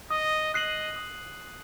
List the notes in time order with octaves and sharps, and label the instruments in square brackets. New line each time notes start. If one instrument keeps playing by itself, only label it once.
[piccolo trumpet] D#5 [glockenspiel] D#6
[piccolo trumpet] D#5 [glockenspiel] F#6 C7 D#7 F#7
[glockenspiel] D#6